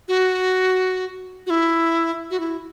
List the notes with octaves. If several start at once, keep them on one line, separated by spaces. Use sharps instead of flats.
F#4
F#4
E4
F#4
E4